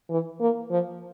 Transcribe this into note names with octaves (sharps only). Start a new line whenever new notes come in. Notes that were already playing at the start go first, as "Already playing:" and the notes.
E3
A#3
F3